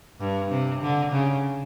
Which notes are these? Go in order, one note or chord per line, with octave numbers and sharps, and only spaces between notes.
G2
C3
D3
C#3